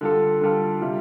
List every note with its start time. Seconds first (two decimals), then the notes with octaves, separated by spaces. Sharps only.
0.01 D3 G3 F4 A4
0.41 D3 G3 F4 A4
0.81 C3 G3 F4